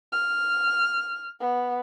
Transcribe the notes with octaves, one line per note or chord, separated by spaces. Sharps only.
F6
B3